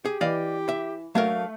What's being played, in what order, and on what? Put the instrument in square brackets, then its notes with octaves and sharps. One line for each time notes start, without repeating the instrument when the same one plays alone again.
[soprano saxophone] G4 [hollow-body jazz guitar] G#4
[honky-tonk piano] E3 [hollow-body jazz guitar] D5 D#5 F5
[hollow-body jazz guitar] E5
[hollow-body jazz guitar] F#3 D4 A#4 [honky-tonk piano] A3 [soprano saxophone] F5